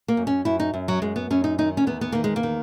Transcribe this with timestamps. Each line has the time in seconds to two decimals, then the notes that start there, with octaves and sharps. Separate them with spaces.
0.08 A#3
0.17 F#2
0.27 C#4
0.45 F#2 E4
0.60 D#4
0.74 F#2
0.88 F#3
1.02 F#2 G#3
1.16 B3
1.30 F#2 C#4
1.44 D#4
1.58 D#3 D#4
1.77 C#4
1.87 E2 B3
2.01 B3
2.12 D#3 A#3
2.24 G#3
2.36 A#3
2.43 D#3